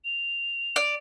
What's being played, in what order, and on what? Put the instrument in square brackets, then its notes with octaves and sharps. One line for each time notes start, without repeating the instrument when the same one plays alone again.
[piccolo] F7
[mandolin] D5